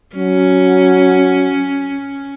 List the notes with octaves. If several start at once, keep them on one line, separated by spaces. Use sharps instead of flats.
F#3 C#4